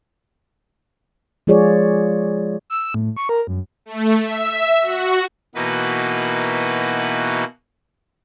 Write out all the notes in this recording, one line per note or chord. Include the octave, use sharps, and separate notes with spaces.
F3 G#3 F4 G#4 C#5 D5
E6
A2
C#6
A#4
F#2
A3
E5
F#4
B2 E3 A#3 D#4 F#4 B4